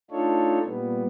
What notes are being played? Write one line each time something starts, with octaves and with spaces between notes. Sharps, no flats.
A3 D4 D#4 F4 A4 C#5
A#2 G3 B3